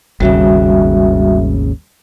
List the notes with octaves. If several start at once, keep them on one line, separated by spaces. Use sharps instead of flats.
G#1 D#2 C#3 G3 F#4 E5